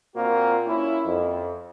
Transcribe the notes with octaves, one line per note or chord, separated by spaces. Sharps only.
A#2 A#3 C4 F4 F#4
A#3 C#4 E4
F2